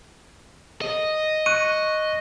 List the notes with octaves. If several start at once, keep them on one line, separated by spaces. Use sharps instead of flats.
D#5
C#6 F#6 D#7